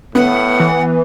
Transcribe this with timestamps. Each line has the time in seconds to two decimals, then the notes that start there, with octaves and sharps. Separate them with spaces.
0.15 A2 B3 F#5
0.60 E3